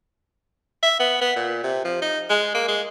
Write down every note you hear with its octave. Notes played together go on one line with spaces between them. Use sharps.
E5
B3
B3
A#2
C3
F3
D#4
G#3
A#3
G#3